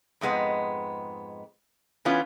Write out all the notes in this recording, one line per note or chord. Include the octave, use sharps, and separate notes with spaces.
F2 G#2 G#3 B3
E3 B3 C#4 F4 B4